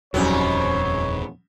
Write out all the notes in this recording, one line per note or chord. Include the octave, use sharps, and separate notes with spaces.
D#1 F2 G#2 F#3 G3 B3 C#4 C#5